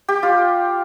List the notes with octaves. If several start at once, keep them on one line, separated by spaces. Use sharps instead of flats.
G4
F4